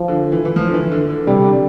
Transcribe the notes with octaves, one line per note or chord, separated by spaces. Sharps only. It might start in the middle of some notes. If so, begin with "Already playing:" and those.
Already playing: F3
D3
E3
E3
F3
D3
E3
D3
D3
C3 G3
D3